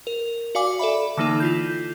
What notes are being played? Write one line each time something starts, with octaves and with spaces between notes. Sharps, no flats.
A#4
F#4 D5 F5 G#5 D6
A4 D5 E5 B5
D3 E3 A#3 D#4 A4
E4 F4 G6